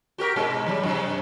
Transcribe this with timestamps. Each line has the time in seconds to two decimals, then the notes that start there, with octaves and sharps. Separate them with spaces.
0.18 F#4 G4 A#4
0.36 G#2 B2 G#3
0.66 D#2 F#3 G3
0.83 F#2 C3